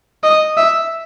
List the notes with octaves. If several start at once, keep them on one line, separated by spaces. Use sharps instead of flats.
D#5
E5